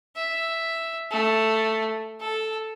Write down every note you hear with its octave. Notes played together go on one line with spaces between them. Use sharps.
E5
A3
A4